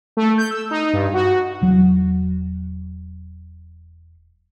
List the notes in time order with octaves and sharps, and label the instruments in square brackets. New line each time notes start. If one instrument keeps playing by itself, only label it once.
[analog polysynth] A3
G6
E6
D#4
G2
F#4
[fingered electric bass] E1 F#3